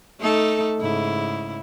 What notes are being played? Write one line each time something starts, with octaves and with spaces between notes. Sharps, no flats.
A3 D#4 A4
G#2 C#3 E4